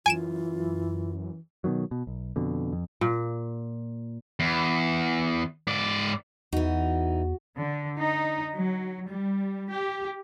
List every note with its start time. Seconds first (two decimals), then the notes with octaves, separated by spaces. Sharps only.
0.06 F#2 E3 F4 G#5 D7 E7
1.64 B2 D3 D#3 F#3
1.91 B2
2.07 B1
2.36 F2 B2 D3
2.72 F2
3.01 A#2
4.40 E2
5.67 G#2 D5
6.53 E2 E3 D#4 F#4
7.58 D3
7.99 D#4
8.54 F#3
9.09 G3
9.70 G4